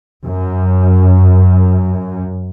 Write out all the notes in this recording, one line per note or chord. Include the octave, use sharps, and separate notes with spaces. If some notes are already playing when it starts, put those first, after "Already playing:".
F#2